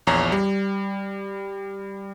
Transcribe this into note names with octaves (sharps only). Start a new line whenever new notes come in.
A#1 E2 C#5 A#5
G3